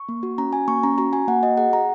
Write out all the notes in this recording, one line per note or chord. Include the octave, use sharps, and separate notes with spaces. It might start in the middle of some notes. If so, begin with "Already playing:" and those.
Already playing: C#6
A#3
F#4
C#4 A#5
F#4 G#5
A#3 C#6
C#4 A#5
F#4 A#5
F#4 G#5
A#3 F#5
F#4 D#5
G#4 F#5
G#4 A#5